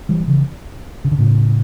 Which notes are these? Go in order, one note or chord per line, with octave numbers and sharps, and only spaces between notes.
E3 G3
C#3 E3
C#3
D3
A2 C#3